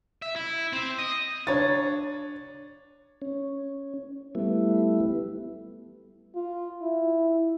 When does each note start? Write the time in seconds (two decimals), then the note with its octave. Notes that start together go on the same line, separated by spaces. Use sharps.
0.22 E5
0.36 E4
0.73 C4
0.99 D#5
1.47 D4 C#5 A6
3.22 C#4
4.35 G3 A3 B3 E4
6.35 F4
6.82 E4